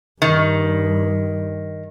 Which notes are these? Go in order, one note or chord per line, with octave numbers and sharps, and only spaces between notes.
G2 D#3